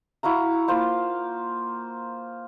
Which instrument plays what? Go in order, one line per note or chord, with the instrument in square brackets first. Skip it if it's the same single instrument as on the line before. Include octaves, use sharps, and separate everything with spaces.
[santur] E4 F#4 F5 A#5
A#3 F4 C5 F5